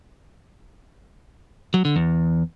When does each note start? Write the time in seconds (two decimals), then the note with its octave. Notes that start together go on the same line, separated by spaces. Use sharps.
1.74 F#3
1.85 D3
1.96 E2